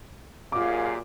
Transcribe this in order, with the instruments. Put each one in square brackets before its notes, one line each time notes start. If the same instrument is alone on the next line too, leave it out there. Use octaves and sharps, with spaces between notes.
[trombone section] F#2 A#2 [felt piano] F4 D6 [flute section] G4 G#4 F5